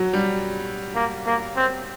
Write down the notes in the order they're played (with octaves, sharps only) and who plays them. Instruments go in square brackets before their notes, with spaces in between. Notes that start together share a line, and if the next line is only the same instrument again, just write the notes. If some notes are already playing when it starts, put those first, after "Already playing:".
Already playing: [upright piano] F#3
G3
[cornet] A#3
A#3
C4